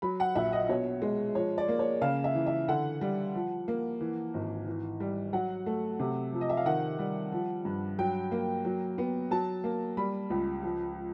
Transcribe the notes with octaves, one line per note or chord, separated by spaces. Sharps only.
F#3 B5
F#5
A#1 E5
D#5
B2 C#5
G#3
F3 C#5
D5
A#3
C#5
C#3 F5
E5
E3
E5
D3 F#5
G3
F3
A#3
E3
G#1
E3
G3
F#3 F#5
A3
C3
F3
D#5
E5
F5
D#3 F#5
G3
F3
G2
F#3 G5
A#3
F#3
B3
F#3 A5
A#3
G3 B5
C#2
F3